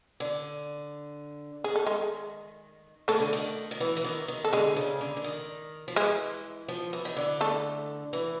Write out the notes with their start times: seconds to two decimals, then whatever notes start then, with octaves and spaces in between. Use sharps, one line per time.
0.20 D3
1.64 D#3 G#4
1.76 A4
1.86 G#3 G#4
3.08 D#3 A3 A4
3.20 D3
3.33 D#3
3.71 D#3
3.80 E3
3.97 E3
4.04 D#3
4.28 D#3
4.44 A4
4.53 D3 G#3 G#4
4.76 C#3
5.01 D3
5.17 D3
5.24 D#3
5.88 F3
5.96 E3 G#3 G#4
6.68 F3
6.93 E3
7.05 D#3
7.16 D3
7.41 A3 A4
8.13 E3